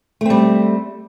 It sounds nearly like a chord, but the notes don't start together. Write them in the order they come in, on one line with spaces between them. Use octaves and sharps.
A3 C4 G3